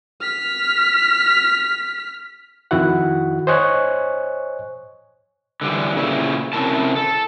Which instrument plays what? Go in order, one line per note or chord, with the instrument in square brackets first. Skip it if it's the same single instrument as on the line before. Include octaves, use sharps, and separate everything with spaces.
[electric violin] F6 B6
[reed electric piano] F2 D#3 E4 F#4 F#5
C5 C#5 D#5 G#5 C#6 F#6
[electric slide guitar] D3 E3 G3
A#2 C#3 E4
C3 C#4 E4 A#4 A5
A4